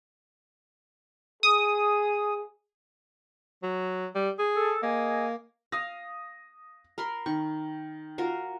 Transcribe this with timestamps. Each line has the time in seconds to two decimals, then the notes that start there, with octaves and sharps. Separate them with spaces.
1.43 G#4 D#6
3.63 F#3
4.15 G3
4.39 G#4
4.55 A4
4.83 A#3 G#4 D#5 G#5
5.72 F5 D#6 A#6
6.98 A#4 B5 C6
7.26 D#3 C#6
8.18 F4 F#4 A#4